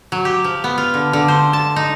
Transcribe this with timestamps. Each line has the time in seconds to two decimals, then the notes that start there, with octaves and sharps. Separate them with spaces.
0.12 F#3
0.25 G4
0.44 F3
0.64 B3
0.78 F4
0.94 D3
1.13 D3
1.28 C5
1.53 A5
1.76 D#4